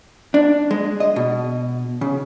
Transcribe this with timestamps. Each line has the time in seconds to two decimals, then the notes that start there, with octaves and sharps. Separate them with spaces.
0.34 D4
0.71 G#3
1.00 D#5
1.16 B2
2.01 C#3